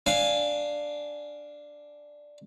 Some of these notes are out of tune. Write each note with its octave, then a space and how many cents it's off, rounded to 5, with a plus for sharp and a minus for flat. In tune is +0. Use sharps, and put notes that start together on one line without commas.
D4 +0 F5 -5 G#5 +0